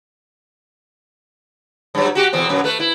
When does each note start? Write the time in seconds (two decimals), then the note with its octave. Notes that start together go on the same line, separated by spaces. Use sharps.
1.95 G2 F#3
2.15 F#4 G4
2.33 E2 B2 C4
2.49 F#2 B2 F#3
2.64 A3 B4
2.80 E4